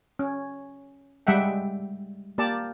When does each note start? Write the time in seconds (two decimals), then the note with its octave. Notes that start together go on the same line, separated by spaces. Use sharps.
0.19 C#4
1.27 G3 G#3 E5 F#5 G5
2.38 A#3 G4 D5 A5